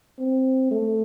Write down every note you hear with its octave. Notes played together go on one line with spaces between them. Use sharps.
C4
A3